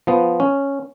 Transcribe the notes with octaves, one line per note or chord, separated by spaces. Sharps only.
F3 B3
C#4